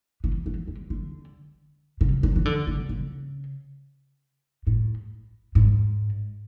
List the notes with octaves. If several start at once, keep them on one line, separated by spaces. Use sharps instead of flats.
E3
E3
D3
D3
C#3
D3
E3
D3
C#3
C#3
A2
G#2